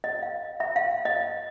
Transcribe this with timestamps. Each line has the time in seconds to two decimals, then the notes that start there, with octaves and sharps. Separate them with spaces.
0.04 D#5
0.22 F5
0.60 E5
0.76 F5
1.05 D#5